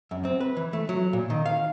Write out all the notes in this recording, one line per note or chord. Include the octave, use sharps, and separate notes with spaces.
F#2
C4
B4
E3
A3
F#3
A#2
D#3
F5